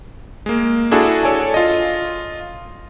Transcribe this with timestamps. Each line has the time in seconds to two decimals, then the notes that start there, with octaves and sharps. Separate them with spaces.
0.46 G#3 A#3
0.91 D4 E4 F#4 G#4 A4
1.23 A4 C#5 D5 G#5 A5
1.54 F4 D#5